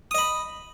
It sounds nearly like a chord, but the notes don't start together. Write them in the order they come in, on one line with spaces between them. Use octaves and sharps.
D#6 D#5 B5